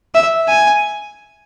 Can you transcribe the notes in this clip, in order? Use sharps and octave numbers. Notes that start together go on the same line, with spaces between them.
E5
G#5